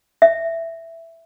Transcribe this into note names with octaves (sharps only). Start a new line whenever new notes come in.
E5